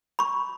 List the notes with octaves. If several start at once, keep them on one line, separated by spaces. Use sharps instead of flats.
B5 C#6